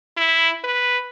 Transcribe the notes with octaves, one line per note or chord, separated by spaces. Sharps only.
E4
B4